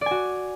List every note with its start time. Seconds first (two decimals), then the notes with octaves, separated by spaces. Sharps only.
0.01 D5
0.06 G#5
0.11 F#4